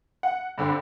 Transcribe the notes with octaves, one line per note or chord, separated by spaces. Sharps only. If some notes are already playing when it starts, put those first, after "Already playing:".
F#5
G2 D3 C4